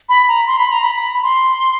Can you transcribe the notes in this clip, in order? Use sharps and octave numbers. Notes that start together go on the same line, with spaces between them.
B5
A#5
C6
B5
A#5
B5
C6